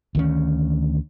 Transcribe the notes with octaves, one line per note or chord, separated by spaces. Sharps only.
D2 D#3 C#4